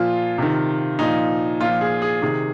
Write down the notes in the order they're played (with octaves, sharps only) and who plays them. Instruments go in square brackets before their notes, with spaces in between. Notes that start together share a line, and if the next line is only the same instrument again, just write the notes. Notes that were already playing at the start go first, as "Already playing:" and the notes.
Already playing: [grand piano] A#2 F3 F4
C3 D#3
A#2 F3 D#4
A#2 F3 F4
G#4
G#4
C3 D#3 G#4